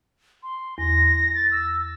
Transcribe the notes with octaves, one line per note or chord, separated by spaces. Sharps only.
C6
E2 A#6
A6
E6